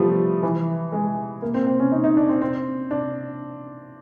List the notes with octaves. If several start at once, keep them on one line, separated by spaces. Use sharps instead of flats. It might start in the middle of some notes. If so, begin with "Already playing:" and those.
Already playing: F3 G3 A3 B3
E3
G#3
A#3
C4
C4
C#4
D#4
D#4
D4
C4
C4
D4